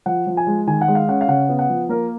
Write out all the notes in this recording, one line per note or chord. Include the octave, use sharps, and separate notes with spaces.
F3 F#5
F3
G#5
G#3
D#3 G#5
F#5
G#3
F5
C#4 F#5
F5
C#3 F#5
B3
F#5
F3
A#3 A#4